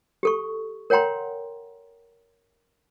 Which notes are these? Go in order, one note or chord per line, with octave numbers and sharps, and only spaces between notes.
G4 A4 C#6
A#4 C#5 F#5 G5 A#5 C6